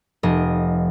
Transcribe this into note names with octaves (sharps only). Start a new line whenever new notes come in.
F1 D#5